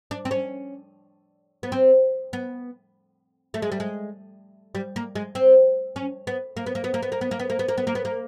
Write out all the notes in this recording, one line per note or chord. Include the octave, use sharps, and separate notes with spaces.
D4
C4
C#4
B3
C4
B3
A3
G#3
G3
G#3
G3
A#3
G#3
C4
C#4
B3
A#3
B3
A#3
B3
A#3
B3
A#3
B3
A#3
B3
A#3
B3
A#3
B3
A#3
B3
A#3